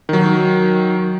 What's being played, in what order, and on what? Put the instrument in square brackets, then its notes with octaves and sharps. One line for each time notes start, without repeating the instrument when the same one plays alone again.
[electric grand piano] D#3 F#3